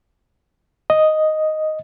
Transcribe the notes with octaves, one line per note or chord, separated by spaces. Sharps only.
D#5